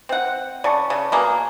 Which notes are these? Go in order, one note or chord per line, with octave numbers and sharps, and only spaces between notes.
C4 F#5
C#3 D5 A5 C#6
C#3
B2 A#3 G#4